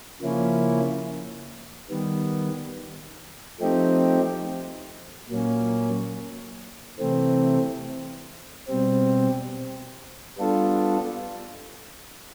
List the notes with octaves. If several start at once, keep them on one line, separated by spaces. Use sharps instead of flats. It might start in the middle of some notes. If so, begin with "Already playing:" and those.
C#3 F3 A#3 C#4 E4
D#3 G3 B3
F3 A3 C4 D#4 G4
A#2 F#3 A#3 C#4
C3 E3 A3 C4
B2 G3 C4
G3 B3 D4 F4 A4